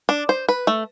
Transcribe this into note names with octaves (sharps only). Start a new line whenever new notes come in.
D4
C5
B4
A3